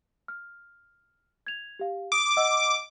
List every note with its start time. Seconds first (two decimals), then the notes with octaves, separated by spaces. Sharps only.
0.28 F6
1.47 G#6 F7
1.79 G4 F5
2.12 D6 D#6
2.37 D#5 F#5 E6